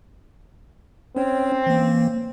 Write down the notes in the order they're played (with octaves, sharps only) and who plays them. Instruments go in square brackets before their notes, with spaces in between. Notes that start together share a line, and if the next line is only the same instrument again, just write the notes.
[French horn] C4 [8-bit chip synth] C#4 C#5
[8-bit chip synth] E3 A#3